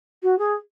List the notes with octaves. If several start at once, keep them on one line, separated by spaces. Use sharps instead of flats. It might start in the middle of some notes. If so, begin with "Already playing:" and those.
F#4
G#4